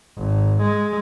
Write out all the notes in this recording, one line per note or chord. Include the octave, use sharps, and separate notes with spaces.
G#1
G#3